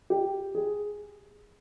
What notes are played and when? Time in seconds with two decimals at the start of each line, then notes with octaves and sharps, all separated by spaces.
0.10 G4
0.55 G#4